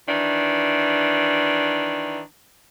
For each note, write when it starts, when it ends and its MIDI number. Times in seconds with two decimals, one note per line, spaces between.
0.08 2.21 51
0.08 2.21 52
0.08 2.21 62